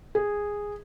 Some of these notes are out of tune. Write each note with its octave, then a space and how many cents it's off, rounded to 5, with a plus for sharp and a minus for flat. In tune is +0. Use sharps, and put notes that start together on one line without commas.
G#4 -10